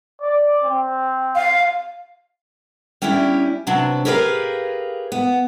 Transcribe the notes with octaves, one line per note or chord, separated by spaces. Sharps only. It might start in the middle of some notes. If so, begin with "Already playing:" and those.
D5
C4
F5
G3 C#4 D4 E4 G4
C3 F#3 D4 B4
G4 G#4 A#4 B4 C#5 F5
B3